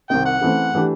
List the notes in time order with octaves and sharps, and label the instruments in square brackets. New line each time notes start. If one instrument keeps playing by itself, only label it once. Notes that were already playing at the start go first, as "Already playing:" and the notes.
[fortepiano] C2 C3 D#3 [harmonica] G5
[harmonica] F#5
[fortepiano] C#3 E3 A3 C4
E3 A3 D4 G4